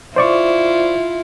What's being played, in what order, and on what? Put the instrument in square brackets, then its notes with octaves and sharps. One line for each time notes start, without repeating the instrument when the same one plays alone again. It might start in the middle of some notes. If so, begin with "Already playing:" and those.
[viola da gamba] E4 F4 [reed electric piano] C5 D5 C#6